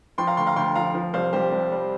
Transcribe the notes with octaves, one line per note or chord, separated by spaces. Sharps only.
F3 G5 C6
F5 A#5
D2 G5 C6
F5 A#5
D2 G5 C6
F3 F5 A#5
F3
C2 C5 F5
C2 G4 C5
C2
G3